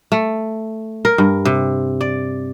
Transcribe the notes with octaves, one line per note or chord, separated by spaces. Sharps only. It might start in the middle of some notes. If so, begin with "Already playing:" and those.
A3
A#4
G2
C3
D5